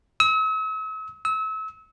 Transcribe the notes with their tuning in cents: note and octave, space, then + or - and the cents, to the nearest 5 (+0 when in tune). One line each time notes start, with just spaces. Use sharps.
E6 -45
E6 -35